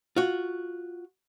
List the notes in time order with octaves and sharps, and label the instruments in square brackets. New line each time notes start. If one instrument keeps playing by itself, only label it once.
[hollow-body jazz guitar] F4 F#4